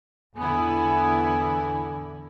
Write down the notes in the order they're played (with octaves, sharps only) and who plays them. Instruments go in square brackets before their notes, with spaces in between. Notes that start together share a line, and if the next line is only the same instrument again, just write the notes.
[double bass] E2 D3 [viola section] B3 E4 [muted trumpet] G#5